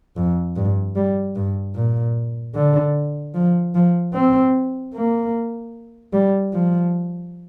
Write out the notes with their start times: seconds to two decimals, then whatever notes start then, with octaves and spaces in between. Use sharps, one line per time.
0.17 F2
0.57 G2
0.96 G3
1.36 G2
1.75 A#2
2.55 D3
3.34 F3
3.75 F3
4.14 C4
4.94 A#3
6.13 G3
6.53 F3